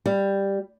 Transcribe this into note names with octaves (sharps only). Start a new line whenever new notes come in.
G3